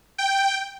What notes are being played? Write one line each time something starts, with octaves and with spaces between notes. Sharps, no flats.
G5